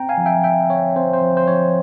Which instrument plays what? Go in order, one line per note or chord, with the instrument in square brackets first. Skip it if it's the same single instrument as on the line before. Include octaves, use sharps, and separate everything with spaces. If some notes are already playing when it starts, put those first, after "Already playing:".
Already playing: [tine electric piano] C4 G5 A#5
F5 G#5
F3
E5 G5
F3 E5 G5
C4 C#5
C4 C5
C5
F3
C5
F3 C#5